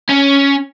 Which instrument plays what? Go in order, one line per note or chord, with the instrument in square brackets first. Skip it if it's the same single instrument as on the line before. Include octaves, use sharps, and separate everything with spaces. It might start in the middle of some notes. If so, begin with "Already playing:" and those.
[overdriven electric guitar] C#4